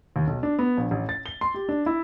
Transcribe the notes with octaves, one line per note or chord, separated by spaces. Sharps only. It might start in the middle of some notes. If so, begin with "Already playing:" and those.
D#2
B1
D4
B3
A#1
A1
A6
G7
C6
G4
D4
E4